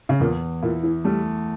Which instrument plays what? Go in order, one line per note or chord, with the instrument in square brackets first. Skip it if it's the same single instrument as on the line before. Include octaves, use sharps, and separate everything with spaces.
[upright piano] C#3
[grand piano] E2 [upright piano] A#2
[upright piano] A#2 [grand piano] E4
[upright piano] E3
[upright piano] G3 [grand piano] A3